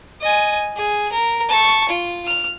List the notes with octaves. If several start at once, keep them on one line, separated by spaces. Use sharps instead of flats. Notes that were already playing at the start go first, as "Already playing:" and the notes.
D#5 G#5
G#4
A#4
A5 C#6
F4
F6